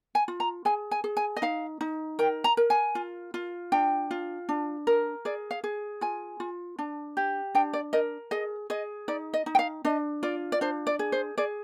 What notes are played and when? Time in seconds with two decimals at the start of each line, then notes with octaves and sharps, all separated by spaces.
0.15 G#5
0.28 F4
0.40 A#5
0.65 G#4 G#5
0.91 G#5
1.04 G#4
1.17 G#5
1.37 D#5
1.42 D#4 F5
1.81 D#4
2.19 A#4 G5
2.44 A#5
2.57 A#4
2.70 G#5
2.95 F4
3.34 F4
3.72 D4 G5
4.11 F4
4.49 D4
4.87 A#4
5.25 G#4 D5
5.51 F5
5.64 G#4
6.01 F4 G#5
6.40 F4
6.79 D4
7.17 G4
7.55 D4 G5
7.73 D5
7.93 A#4 D#5
8.31 G#4 D#5
8.70 G#4 D#5
9.08 D#4 D5
9.34 D#5
9.46 D#4
9.55 G5
9.59 F5
9.85 D4 D#5
10.23 F4 D5
10.52 D5
10.61 D4 C5
10.87 D5
10.99 G#4
11.12 C5
11.38 G#4 D5